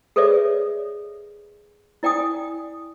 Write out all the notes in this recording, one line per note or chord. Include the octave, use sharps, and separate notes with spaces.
G#4 A4 B4 C#5 D5 E5
E4 D5 G5 G#5 D#6